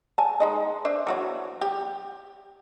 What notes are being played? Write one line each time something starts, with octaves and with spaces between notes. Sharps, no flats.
G#5 A5
G#3 D#4 D#5
D4 C5 E5
E3 F#3 F#4
G4